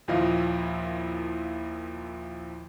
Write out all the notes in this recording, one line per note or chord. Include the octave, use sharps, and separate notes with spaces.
D#2 A#2 F3 E4 D#5 F5